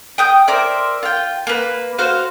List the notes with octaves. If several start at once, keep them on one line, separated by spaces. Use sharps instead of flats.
G5 D#6 G6
A#4 C5 D5 E5
F4 G5
A#3 B4
F#4 C5 F5